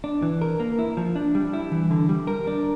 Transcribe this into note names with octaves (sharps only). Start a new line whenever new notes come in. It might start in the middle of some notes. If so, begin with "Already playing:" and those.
D4
E3
A#4
A#3
E4
F3
D4
G3
E4
E3
D3
G3
A#4
D4